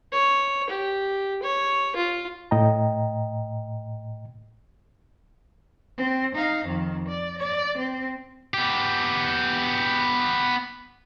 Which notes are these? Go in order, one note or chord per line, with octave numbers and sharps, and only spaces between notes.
C#5
G4
C#5
F4
A2 D#5 G5 A#5
C4
D#4 F5
F2 D#3
D5
D5
C4
B3 G4